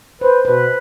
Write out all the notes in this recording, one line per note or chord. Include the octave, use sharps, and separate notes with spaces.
B4 C5
B2 B4